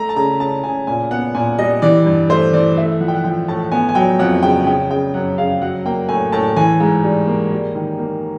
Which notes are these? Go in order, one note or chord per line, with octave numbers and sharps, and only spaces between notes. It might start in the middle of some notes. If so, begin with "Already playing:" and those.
Already playing: A3 A#5
A5
C#3 A#5
C#3 A5
C#3 G#5
A#2 G#5
B3 F#5
A#2 G#5
G3 D#5
E3 D5
G2
A3 C5
E3 D5
A3 E5
F3 F#5
G5
F#5
F3 G5
A2 A5
B3 G#5
G#5
F#3 G5
F2 F#5
C#3 G5
C#3 G5
C#3 G5
F#2 F#5
C#3 F5
F#3 F#5
A#3 G5
A2 G#5
A2 A5
E3 G#5
G#2
G3
A#3
G3
D#3
A#3